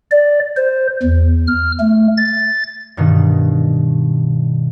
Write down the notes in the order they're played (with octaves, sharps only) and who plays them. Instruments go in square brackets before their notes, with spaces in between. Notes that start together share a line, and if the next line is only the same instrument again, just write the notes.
[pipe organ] D5
C5
E2
F6
A3
A6
[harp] G2 B2 D#3